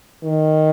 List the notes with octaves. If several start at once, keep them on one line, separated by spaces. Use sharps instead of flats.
D#3